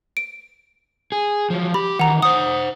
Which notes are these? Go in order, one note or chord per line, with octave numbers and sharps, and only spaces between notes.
D7
G#4
F3 F#3
G4 B5
D#3 E3 F#5 A#5
C5 F#5 D#6